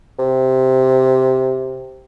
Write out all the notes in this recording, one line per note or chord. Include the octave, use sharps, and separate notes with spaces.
C3